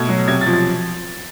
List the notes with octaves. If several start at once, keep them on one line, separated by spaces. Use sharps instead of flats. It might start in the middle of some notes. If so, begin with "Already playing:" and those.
Already playing: B2 A3 G#6
F#3
C3 G#6
A6
F3
A6